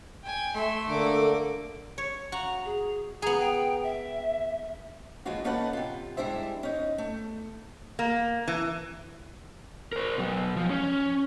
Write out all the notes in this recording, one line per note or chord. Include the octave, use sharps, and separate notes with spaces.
G5 G#5
A3 E5 C6
D3 A#3 A4 D6
C#5
F#4 A#5
G#4
B3 G#4 A#5
G5
E5
E3 F3 G#3 A#3 F4 F#4
A#3 C#4 D#4 A4 B4 F#5
C3 F4
G3 G#3 D4 E4 C5 E5
C#4 D#4
A3
A#3
E3
A#4 C5
B2 F#3
F3
C#4